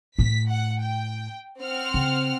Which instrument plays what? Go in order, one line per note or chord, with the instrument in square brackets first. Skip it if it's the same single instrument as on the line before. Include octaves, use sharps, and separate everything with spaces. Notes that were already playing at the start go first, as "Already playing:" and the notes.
[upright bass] A2 A3 [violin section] B6
[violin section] F#5
G5
C4 F#5 F6
[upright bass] C#3